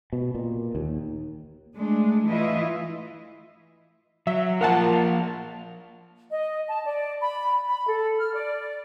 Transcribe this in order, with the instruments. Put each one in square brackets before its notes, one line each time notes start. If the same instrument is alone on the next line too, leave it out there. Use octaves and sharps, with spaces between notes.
[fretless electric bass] B2
A#2
D#2
[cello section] G#3 A3 D4
E3 A3 E4 F4 D#5 E5
[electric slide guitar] F#3 [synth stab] E5
[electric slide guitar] F3 A#3 F4 [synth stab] A#4 F#5 A5
[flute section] D#5
A5
D5
B5
B5
A4
F6
D5